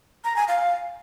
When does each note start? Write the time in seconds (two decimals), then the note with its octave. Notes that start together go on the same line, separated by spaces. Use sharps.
0.24 A#5
0.36 G#5
0.48 F5